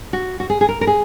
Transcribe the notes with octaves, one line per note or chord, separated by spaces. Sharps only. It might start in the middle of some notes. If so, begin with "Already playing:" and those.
F#4
F#4
G#4
G#4
A#4
A#4
G#4